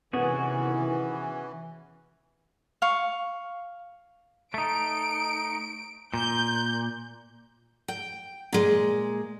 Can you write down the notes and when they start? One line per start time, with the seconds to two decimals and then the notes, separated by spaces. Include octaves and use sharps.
0.13 C3 D#3 E3 B3 C#4 F#4 G#4
2.82 F5 C#6
4.54 A3 D#4 D7
6.14 A#2 G6
7.88 G5
8.53 A#2 G#3